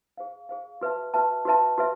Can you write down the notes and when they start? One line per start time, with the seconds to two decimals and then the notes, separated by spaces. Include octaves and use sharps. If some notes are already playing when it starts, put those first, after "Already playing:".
0.18 G#4 C5 F5
0.49 G#4 C5 F5
0.81 F#4 B4 E5 A5
1.14 F#4 B4 E5 A5
1.45 F#4 B4 E5 A5
1.78 F#4 B4 E5